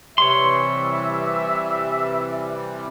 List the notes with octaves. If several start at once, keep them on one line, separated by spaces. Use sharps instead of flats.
C3 E3 G3 C#5 E5 C6